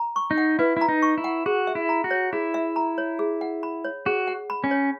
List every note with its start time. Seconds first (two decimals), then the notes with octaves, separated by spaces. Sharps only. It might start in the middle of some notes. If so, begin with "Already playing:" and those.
Already playing: A#5
0.16 C#6
0.31 D#4
0.38 F#5
0.59 E4 B4
0.77 E4 A#5
0.89 D#4
1.02 C#6
1.18 E4
1.24 F#5
1.46 F#4 G#4
1.67 E5
1.75 E4
1.89 A#5
2.04 F#4
2.11 C#5
2.33 E4 G#4
2.54 E5
2.76 A#5
2.98 C#5
3.19 G#4
3.41 F#5
3.63 B5
3.84 C#5
4.06 F#4 G#4
4.27 F#5
4.50 B5
4.64 C#4
4.71 C#5